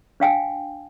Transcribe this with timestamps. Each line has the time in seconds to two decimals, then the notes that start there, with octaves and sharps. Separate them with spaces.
0.20 D4 F5 G5 G#5